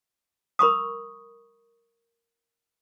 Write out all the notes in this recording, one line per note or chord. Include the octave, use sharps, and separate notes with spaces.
A#4 B5 C#6 D#6